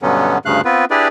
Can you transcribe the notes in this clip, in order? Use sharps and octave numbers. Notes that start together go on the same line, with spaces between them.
G2 B2 D3 F#3 B3 C#4
D2 G2 C#3 A3 F5 F#6
B3 C4 F4 B4
D4 E4 G4 G#4 B4 D5